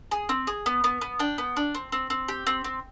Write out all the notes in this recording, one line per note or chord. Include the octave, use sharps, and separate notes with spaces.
G#4
C4
G#4
B3
B3
B3
D4 G5
B3
D4
C4
C4
C4
G4
C4
C4